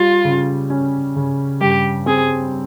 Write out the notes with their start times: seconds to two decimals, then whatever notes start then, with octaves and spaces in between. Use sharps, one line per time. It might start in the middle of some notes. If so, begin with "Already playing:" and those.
Already playing: G3 F4
0.25 C#3
0.70 C#4
1.16 C#3
1.61 G2 G4
2.06 C4 G#4